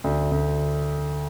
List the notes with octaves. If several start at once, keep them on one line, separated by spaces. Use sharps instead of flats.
D2
D2